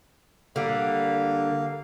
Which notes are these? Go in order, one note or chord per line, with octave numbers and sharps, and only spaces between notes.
D3 G3 A#3 F5